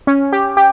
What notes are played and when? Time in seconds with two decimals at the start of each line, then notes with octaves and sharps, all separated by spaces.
0.07 C#4
0.32 G4
0.57 G4